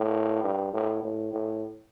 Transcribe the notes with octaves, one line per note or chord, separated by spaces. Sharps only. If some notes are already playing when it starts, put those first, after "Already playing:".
Already playing: A2
G2
A2
A2
A2